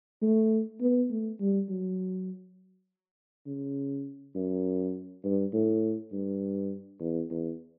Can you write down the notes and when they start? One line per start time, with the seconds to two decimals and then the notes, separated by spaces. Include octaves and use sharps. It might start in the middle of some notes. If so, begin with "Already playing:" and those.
0.22 A3
0.81 B3
1.10 A3
1.40 G3
1.69 F#3
3.47 C#3
4.35 F#2
5.24 G2
5.53 A2
6.12 G2
7.00 E2
7.30 E2